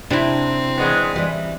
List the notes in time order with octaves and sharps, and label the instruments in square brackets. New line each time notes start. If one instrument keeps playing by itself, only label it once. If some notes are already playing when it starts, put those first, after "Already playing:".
[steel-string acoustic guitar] C3 [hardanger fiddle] C4 [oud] D4 E4
[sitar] E2 G#3 B3
[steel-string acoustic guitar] E3 G3